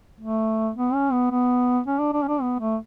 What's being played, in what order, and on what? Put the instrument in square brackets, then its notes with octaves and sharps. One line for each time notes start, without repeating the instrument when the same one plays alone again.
[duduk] A3
B3
C#4
B3
B3
C#4
D4
D4
C#4
D4
B3
A3